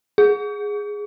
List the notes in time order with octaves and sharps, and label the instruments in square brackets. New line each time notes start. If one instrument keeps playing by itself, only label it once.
[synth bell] G#4